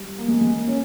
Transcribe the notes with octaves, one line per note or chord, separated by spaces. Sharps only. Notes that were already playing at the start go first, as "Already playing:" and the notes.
Already playing: G3
A#3
G#3
G#3
A#3
C#4